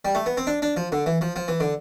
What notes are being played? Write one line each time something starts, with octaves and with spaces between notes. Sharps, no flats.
G3
A3
B3
C4
D4
D4
F3
D3
E3
F3
F3
E3
D3